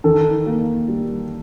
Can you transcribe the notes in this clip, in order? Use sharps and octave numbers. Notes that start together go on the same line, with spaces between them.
D#3 A4
A#3
G3